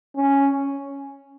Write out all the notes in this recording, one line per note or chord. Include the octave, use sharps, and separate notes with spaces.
C#4